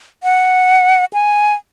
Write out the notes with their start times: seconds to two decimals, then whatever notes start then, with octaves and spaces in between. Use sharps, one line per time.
0.23 F#5
1.13 G#5